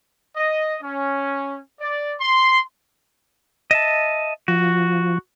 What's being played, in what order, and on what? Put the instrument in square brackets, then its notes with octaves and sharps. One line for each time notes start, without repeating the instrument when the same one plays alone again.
[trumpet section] D#5
C#4
D5
C6
[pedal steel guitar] D#5 E5 A5
[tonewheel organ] F3 [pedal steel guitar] F#4